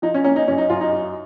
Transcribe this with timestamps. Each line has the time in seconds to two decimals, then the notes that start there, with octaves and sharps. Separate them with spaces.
0.02 F3 D#4
0.14 C#4
0.24 A#3 C#4
0.36 D#4
0.48 F#2 C#4
0.58 D#4
0.70 F#2 F4
0.81 D#4
0.92 F#2